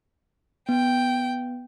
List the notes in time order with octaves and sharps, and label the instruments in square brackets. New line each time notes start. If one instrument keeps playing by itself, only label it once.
[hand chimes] B3 [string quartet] G5